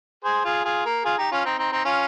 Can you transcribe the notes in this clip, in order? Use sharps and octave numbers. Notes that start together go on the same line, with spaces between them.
G#4 C5
F4 G#4
F4 G#4
A#3
F4 G#4
D#4 G4
C#4 F4
C4 D#4
C4 D#4
C4 D#4
C#4 F4